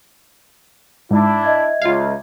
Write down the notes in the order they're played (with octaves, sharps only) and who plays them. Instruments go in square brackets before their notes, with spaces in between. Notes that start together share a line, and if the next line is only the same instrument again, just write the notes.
[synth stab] G#2 [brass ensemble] D4 E4
[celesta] D#5 E5 G#6
[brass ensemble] C#2 [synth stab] F4 F5